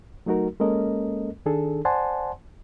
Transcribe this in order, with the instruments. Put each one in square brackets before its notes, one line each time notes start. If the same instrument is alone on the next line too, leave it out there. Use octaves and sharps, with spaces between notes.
[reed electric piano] F#3 A3 D#4 F#4 A#4
G#3 A#3 C#4 A4 A#4 D#5
D#3 D4 G#4 A4
C5 D5 F#5 G#5 A5 C6